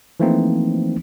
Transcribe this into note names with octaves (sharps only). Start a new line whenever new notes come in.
E3 F3 A3 A#3 C4 D#4